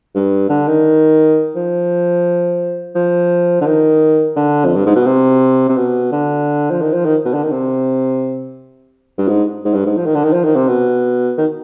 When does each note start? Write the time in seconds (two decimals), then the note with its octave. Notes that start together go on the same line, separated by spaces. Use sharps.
0.15 G2
0.49 D3
0.68 D#3
1.56 F3
2.95 F3
3.61 D3
3.66 D#3
4.36 D3
4.65 F2
4.76 G2
4.86 G#2
4.95 B2
5.06 C3
5.69 C3
5.77 B2
6.12 D3
6.71 F3
6.82 D#3
6.94 F3
7.05 D#3
7.25 B2
7.34 D3
7.43 D#3
7.52 C3
9.18 G2
9.28 G#2
9.65 G#2
9.74 G2
9.86 G#2
9.97 F3
10.06 D#3
10.15 D3
10.24 D#3
10.33 F3
10.45 D#3
10.56 C3
10.68 B2
11.38 D#3